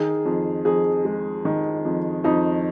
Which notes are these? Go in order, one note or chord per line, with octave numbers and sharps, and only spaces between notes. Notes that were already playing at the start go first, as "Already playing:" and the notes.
Already playing: D#3 G#4
F2
F2 G#4
G#3
D#3
F2
F2 D#4